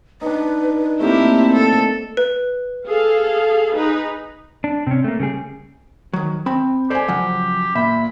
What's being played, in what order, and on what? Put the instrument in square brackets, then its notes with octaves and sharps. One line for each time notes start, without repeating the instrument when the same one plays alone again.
[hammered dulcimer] D4 D#4 [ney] B4
[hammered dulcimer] A3 A#3 [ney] C4 [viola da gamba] E4 G4
[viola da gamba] A4
[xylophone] B4
[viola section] G#4 A4 F5
D#4 G#4 B4
[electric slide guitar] D4
C3 C#4
A3 A#3
C#3 G3 G#4
[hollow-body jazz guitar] D#3 F#3
[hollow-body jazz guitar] C4 B5 [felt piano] G5
[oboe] G4 [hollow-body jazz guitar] A4 D5 [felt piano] C5 G#5
[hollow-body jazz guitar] C#3 F3 F#3 [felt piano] F#5
[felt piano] A#2 [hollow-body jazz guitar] E5 [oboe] B5